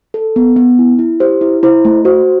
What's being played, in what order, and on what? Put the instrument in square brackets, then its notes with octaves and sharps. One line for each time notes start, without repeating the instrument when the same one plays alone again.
[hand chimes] A4
B3
B3
E4
E4
G4 C5
E4
E4 C5
A3
F#4 C5